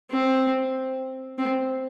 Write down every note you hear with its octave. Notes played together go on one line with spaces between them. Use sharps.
C4
C4